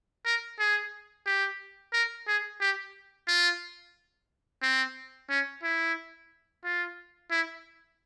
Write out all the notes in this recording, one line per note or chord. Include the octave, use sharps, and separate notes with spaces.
A#4
G#4
G4
A#4
G#4
G4
F4
C4
C#4
E4
F4
E4